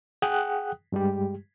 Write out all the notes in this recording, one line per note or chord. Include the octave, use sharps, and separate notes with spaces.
G#4 F#5 G5 D#6 F#6
G2 G3 G#3 G4